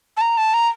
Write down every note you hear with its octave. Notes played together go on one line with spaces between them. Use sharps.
A5
A#5
A5
A#5